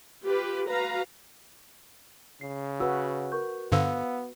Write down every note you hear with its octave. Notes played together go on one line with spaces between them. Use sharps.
F4 G4 B4
F#4 B4 F5 A#5
C#3 C7
F#4 B4 E6
A#4 C#6 G6
G2 D3 B3 C5 F5 E6